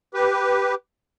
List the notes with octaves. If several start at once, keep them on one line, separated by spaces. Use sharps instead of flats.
G4 B4